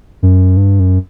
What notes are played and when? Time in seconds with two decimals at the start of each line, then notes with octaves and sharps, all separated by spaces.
0.22 F#2
0.57 G2
0.80 F#2